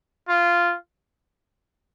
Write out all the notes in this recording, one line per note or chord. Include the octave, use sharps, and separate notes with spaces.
F4